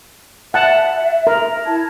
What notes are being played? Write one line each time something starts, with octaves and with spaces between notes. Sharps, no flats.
E5 F#5 A5
A#4
E4 A5 G#6